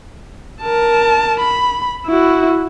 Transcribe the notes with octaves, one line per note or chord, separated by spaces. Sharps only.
A#4 A5
B5
E4 F#4